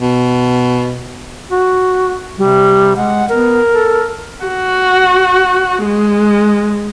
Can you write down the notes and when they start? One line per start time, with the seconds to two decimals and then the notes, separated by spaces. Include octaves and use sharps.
0.01 B2
1.51 F#4
2.38 C3 G3
2.96 G#3 F#5
3.29 B3 A#4
3.74 A4
4.44 F#4
5.85 G#3